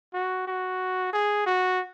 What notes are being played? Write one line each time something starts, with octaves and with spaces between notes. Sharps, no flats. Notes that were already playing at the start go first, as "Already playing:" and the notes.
F#4
F#4
G#4
F#4